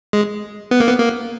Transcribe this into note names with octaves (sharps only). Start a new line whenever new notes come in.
G#3
B3
A#3
B3
A#3